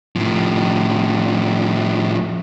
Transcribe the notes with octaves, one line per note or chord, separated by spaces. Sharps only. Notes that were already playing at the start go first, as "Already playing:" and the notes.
A2 F3